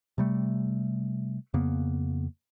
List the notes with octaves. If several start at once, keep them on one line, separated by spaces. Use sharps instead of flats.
C3 G3 A3
F2 C#3 A#3 B3